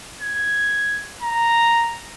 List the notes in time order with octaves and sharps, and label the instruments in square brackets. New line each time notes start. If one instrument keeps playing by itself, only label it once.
[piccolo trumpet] G#6
A#5